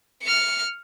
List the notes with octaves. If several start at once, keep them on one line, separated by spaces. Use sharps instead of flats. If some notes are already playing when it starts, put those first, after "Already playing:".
F6 C#7